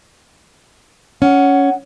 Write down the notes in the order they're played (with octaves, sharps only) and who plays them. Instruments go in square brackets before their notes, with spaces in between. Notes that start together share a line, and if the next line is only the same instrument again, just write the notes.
[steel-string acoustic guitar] C#4 [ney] F#5